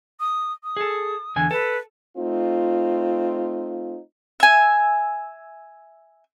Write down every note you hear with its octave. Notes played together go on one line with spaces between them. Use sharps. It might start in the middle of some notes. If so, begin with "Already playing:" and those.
D#6
D#6
G#4 A4
E2 D3 G#5
A4 B4
A3 C4 D#4 F4
E5 G#5